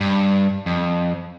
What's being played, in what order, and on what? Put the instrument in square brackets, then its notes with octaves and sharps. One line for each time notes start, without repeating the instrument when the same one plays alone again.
[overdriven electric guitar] G2
F2